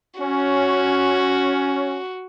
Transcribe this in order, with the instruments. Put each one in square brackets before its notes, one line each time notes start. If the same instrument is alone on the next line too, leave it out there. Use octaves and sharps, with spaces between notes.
[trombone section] C#4 [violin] F#4